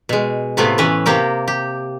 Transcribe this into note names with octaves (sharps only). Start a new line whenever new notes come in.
B2 G#3
A2 C3 A3 B3 F4
E3 C#4 B4 E5
C3 A#3 G4 A#4
G4